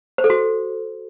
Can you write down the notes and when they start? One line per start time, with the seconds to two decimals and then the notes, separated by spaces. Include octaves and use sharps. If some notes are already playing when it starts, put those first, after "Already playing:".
0.18 C5
0.24 A4
0.30 F#4